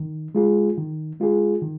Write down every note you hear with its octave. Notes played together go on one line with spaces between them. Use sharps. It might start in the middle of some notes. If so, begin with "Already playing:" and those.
Already playing: D#3
G#3 F4 G#4
D#3
G#3 F4 G#4
D#3